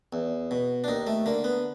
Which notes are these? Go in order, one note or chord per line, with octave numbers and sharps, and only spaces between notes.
E2
B2
D4
D#2 D#4
A3
D3 A#3
B3